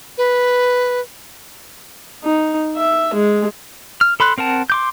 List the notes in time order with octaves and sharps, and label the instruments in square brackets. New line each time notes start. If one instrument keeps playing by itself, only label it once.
[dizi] B4
[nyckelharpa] D#4
E5
G#3
[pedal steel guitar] F6
A4 B5 C6 F#6
C4 A#4 F#5 A5
C6 D6 G6